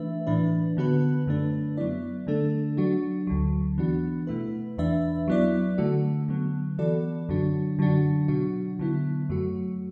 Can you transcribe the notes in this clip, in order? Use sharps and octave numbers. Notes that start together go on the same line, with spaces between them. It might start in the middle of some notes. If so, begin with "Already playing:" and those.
Already playing: E3 A3 D4 B4 E5
A2 E3 D4 B4
D3 B3 F#4 B4
F#2 D3 A3 D4 B4
F#3 B3 E4 D5
D3 A3 D4 A4
F#3 D4 F#4
D2 D3 F#3
E3 B3 D4 F#4
B2 A3 E4 B4
E2 E3 D4 B4 E5
F#3 B3 E4 D5
D3 A3 F#4
D3 F#3 B3
E3 B3 F#4 A4 D5
F#2 D3 F#3 D4 F#4
D3 F#3 D4 F#4
B2 F#3 D4 F#4
D3 F#3 B3 E4
F#2 F#3 A3 F#4